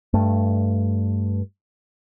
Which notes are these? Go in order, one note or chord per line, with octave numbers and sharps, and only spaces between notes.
G2 A3